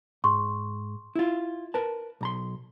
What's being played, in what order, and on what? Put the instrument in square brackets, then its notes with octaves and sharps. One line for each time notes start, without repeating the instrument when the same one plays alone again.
[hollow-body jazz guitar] G#2 [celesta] C6 C#6
[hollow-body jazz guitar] E4 F4
A#4 B4 A5
B1 A#5 C6